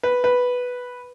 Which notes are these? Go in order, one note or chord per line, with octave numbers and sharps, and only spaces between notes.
B4
B4